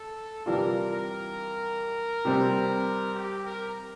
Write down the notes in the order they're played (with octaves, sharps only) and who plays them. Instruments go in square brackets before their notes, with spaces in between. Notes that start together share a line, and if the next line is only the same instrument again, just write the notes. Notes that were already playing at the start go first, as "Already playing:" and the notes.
Already playing: [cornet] A4
[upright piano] C3 E3 G3 D4 F4 [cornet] A#4
[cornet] A#4
[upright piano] C3 G3 C4
[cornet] G4
A#4